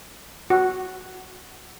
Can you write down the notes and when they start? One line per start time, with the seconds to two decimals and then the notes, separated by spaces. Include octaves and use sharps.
0.50 F#4